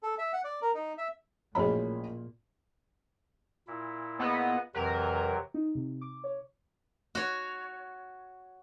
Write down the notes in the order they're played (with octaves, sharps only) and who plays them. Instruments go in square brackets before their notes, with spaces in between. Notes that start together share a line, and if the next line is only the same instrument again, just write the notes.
[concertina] A4
E5
F#5
D5
A#4
D#4
E5
[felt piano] A1 C#4 B5 [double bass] A#2 [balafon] F3 F#4 G#4
[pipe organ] A#2 E4
[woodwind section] A#3 G#4 D#5 [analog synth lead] B3
[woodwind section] F2 E3 [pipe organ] C3 F#3 [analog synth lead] A#4
[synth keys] D#4
C3
D6
C#5
[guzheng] F#4 C#5